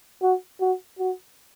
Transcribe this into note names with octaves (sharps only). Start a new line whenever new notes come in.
F#4
F#4
F#4